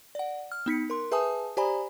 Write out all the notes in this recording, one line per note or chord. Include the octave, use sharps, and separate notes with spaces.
D5 F#5
F6
B3 D#4 B6 C#7
A#4 C6
G#4 B4 E5 G#5 A5 D#6
G4 C5 D5 G#5 A#5 B5